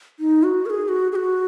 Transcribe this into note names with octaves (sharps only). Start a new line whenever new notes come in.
D#4
F#4
A#4
G#4
F#4
G#4
F#4